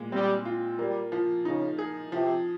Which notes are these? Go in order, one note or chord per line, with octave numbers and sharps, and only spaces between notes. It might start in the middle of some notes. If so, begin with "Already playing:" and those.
Already playing: A#2 G#3
G3 C4
F4
G3 A#3
F3
C#3 D#4
G#4
C3 F3